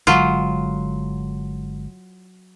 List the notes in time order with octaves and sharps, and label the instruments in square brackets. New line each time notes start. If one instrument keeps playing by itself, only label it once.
[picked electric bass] G1 D3 G#3 [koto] F#3 F4